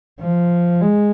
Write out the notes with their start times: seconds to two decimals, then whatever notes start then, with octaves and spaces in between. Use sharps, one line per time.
0.20 F3
0.81 G#3